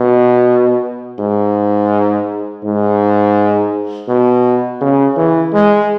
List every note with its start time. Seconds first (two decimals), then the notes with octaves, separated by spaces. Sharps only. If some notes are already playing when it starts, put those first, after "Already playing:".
Already playing: B2
1.19 G#2
2.64 G#2
4.09 B2
4.81 C#3
5.17 E3
5.54 G#3